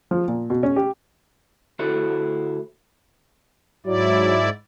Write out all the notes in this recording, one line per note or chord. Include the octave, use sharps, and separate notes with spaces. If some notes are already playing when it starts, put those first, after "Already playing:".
F3
A#2
B2
C#4
G4
D2 E4 F#4 A4 C5
G#2 F#3 E4 D5